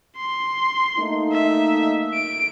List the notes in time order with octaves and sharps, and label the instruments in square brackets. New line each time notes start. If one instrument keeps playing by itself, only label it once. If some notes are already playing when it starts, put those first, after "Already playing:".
[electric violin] C6
[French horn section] A3 A#3 D#4
[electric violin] E5
D7